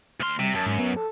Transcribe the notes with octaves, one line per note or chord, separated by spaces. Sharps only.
D2 C6 F6
C3 G3
F#2 A5
G#2
B3
A4